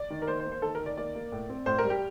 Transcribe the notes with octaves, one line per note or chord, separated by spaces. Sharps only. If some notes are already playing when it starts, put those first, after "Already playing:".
Already playing: D5
D#3
A#4
A#3 C5
C5
A#3
C5
D#3 A4
A#4
D#3
D5
A#3 D5
A#3
A2
C4
A2 C5
A#4
G3
G4